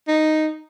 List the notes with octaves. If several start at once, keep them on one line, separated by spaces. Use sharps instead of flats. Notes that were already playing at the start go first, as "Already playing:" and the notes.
D#4